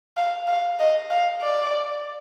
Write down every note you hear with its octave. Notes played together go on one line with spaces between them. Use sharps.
F5
F5
D#5
F5
D5